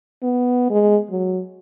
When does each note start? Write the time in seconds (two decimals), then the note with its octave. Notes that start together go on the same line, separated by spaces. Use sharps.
0.23 B3
0.70 G#3
1.11 F#3